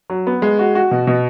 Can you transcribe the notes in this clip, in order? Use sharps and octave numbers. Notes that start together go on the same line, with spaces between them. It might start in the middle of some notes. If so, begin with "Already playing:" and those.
F#3
B3
G#3
F#4
F#4
B2
B2